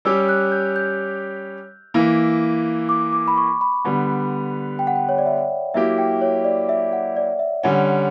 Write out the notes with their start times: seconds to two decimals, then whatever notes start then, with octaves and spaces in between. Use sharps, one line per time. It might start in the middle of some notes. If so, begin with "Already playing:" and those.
0.05 G3 C#4 G4 E6
0.29 F#6
0.52 G6
0.76 G6
1.94 E3 A#3 E4
2.89 D6
3.13 D6
3.28 B5
3.37 C#6
3.61 B5
3.85 D3 G3 B3
4.79 G5
4.87 F#5
4.96 G5
5.09 C#5
5.18 D5
5.26 E5
5.74 F#3 A#3 E4 G4 E5
5.98 G5
6.22 C#5
6.45 D5
6.69 E5
6.93 F#5
7.16 D5
7.39 E5
7.63 D3 G3 C#4 F#5